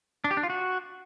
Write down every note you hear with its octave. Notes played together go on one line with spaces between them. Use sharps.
D4
G4
D4
F4
F#4